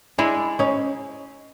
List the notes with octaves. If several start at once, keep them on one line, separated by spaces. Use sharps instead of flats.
G#3 D4 E4
C#4 D#4